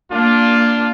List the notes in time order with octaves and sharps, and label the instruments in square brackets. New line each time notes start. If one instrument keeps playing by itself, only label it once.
[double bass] A#3 [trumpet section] D4 F4